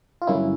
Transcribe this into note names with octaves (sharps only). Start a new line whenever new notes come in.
F4
G2 D3 F#3 A#3 C#4 E4